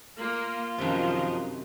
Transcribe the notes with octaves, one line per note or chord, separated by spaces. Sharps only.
A#3 F4
F#2 C3 D#3 F3 A#4